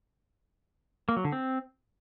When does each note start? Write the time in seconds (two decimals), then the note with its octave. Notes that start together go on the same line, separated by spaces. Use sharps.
1.09 A#3
1.17 F#3
1.24 D3
1.32 C4